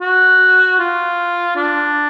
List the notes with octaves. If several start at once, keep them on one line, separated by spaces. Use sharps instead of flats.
F#4
F4
D4